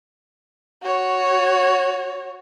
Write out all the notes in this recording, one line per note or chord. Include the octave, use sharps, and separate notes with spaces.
F#4 C#5